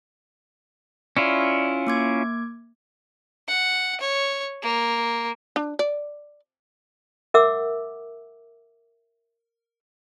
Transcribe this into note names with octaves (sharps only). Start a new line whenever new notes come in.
C#4 E4 F4 D5
A#3 D6 G#6
F#5
C#5
A#3
D4
D5
A#4 E5 F#5 D6 E6